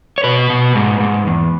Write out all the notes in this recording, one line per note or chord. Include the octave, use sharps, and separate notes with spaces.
C#5
B2 B4
B2
G#2
G#2
E2